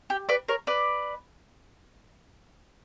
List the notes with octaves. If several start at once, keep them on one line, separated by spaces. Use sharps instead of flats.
G4
B4 D5
A#4 C#5
B4 D5